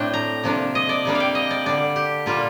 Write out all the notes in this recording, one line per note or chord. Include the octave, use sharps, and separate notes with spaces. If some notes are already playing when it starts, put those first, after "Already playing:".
Already playing: A2 A3 C4 D4 G5
A#5
C3 F3 A#3 D4
D#5
D5
C3 G3 A#3 D4
F5
G5
D#5
D5
D3 G3 D4 D5
G4
A#2 G3 A#3 F4